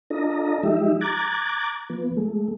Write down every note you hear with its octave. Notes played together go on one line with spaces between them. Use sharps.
D4 F4 A4 D#5 A#5
F3 G#3 D#4 G4 E5
A#5 D6 F#6 G#6 A6
F3 B3
G#3 A3